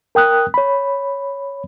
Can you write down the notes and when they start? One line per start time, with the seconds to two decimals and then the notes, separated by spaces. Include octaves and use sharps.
0.15 A#4 G5 D#6 F#6
0.54 C#5 B5